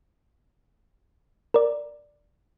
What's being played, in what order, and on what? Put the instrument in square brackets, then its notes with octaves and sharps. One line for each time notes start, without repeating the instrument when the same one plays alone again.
[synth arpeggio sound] A#4 D5